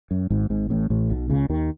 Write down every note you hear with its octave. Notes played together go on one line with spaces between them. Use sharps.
F#2
G#1 G#2
G#1 G#2
A1 A2
A1 A2
B1 B2
C#2 C#3
D#2 D#3